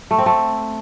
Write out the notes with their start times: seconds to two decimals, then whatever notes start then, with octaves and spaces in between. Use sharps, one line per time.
0.11 A3
0.18 C4
0.26 A3